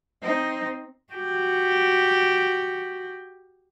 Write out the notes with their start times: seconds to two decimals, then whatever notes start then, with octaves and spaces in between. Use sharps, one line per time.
0.22 C4 D#4
1.13 F#4 G4